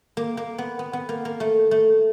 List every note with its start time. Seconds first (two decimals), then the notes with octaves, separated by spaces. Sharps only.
0.17 A#3
0.37 A#3
0.58 B3
0.79 B3
0.93 B3
1.09 A#3
1.25 A#3
1.40 A3
1.71 A3